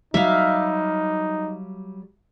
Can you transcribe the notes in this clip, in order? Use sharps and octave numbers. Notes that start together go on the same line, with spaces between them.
F#3 G3 D#4 G4 E5 F5